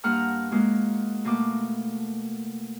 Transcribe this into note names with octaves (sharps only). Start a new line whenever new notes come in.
G2 A#3 F#5 A#5 F6
G#3 A#3 F#4
B2 A3 A#3 D6